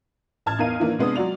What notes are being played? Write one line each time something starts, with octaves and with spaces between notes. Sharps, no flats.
A1 A5 F6 G#6
E2 D#4 A#4 F5 D#7
D#3 E3 A#3 D4
C3 G#3 B3 D4 D#6
F#3 F#4 D5 F7